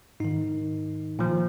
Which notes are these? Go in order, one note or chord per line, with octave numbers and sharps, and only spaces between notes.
G#2 D#3 D#4
A#2 F3